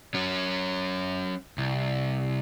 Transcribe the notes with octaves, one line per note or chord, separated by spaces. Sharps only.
F#3 C#4
C2